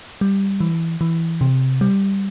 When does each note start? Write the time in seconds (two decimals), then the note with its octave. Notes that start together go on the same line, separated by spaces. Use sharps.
0.21 G3
0.60 E3
1.01 E3
1.41 C3
1.81 G3